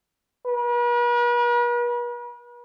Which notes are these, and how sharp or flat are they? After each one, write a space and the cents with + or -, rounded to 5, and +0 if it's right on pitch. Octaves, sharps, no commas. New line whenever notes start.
B4 -45